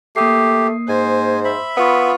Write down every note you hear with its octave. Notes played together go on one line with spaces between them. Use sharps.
A3 A#3 G4 D#6 C7
G#2 C5 G#5
E5 B5
B3 F4 C#6 D#6